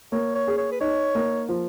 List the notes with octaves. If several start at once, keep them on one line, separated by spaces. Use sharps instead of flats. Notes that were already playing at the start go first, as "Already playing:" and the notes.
A#3 C#5
C#5
G#4
C#5
B4
D#4 C#5
A#3
F3